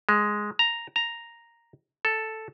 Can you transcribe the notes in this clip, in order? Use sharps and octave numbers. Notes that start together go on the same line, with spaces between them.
G#3
A#5
A#5
A4